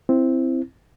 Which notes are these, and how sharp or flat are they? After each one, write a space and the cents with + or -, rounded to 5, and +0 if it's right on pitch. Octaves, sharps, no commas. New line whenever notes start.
C4 +0 E4 +10